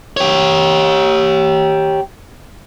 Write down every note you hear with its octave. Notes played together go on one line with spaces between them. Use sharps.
G4 C#5